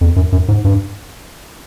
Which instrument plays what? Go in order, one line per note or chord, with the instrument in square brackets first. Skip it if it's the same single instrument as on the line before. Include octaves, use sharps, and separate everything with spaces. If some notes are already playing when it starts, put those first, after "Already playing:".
[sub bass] F2
F#2
F#2
G#2
G2